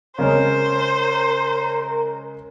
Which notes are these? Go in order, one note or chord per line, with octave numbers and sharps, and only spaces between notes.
C#3 G#3 C#4 A#4 C5